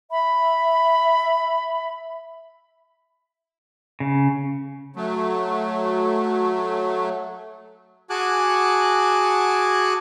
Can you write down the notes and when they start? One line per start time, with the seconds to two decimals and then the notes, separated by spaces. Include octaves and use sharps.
0.11 E5 B5
4.00 C#3
4.96 F#3 A3
8.10 F#4 G#4 G#5 A5 D6 F#6